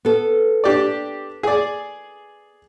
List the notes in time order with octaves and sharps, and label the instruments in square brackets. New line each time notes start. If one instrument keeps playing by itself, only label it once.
[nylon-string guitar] B3 A4
[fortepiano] D4 G4 D5
G#4 D5